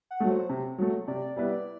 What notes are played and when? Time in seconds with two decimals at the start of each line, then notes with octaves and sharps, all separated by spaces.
0.11 F#5
0.20 F#3 A3
0.30 C5
0.49 C3
0.78 F#3 A3
1.07 C3 D5
1.22 D5
1.36 G3 B3 E4 B4 D5
1.51 D5